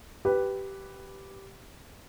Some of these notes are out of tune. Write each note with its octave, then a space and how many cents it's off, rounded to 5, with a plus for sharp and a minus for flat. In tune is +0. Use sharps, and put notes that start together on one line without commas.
G4 -10 B4 +0